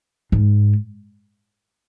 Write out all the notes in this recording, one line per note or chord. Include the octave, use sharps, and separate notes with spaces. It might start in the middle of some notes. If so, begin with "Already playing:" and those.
G#2